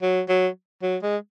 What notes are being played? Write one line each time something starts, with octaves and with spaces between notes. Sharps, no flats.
F#3
F#3
F#3
G#3